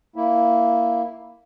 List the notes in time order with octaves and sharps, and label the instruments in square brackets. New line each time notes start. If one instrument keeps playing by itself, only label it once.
[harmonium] A#3 E4